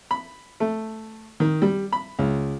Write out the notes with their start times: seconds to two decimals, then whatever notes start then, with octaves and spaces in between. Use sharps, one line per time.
0.11 B5
0.60 A3
1.40 D#3
1.62 G3
1.92 B5
2.19 C#2